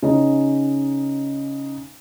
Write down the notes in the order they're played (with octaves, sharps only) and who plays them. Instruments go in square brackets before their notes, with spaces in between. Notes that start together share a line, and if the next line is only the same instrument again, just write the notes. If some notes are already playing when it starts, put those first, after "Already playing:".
[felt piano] C#3 C#4 D#4